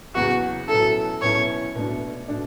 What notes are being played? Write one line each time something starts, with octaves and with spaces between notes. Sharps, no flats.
E2 C#3 F#3 B3 F#4
B2 F#3 C#4 E4 A4
B2 F#3 C#4 E4 C#5
B2 A3 D4
B2 A3 D4